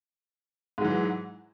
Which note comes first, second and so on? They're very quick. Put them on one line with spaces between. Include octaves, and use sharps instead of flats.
G#2 F#3 E3